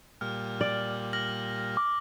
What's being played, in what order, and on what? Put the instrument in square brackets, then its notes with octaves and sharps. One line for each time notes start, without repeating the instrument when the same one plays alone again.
[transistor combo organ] A#2 G3 [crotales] F6
[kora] D5 [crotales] F#7
[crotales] F6 A#6 F#7
[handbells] D6